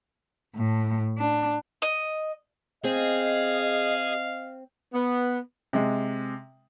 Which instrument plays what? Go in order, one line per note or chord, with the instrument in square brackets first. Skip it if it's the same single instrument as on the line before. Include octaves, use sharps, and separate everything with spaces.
[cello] A2
D4
[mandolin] D#5
[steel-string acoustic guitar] C4 [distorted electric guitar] G#4 [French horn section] D#5 [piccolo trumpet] F5
[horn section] B3
[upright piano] C3 G#3